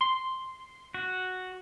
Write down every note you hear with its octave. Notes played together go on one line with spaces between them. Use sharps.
C6
F#4